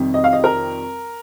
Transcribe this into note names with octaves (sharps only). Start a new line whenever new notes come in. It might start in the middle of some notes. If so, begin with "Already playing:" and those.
Already playing: F2 C3 D#3 G3
D#5
F5
D#5
A#4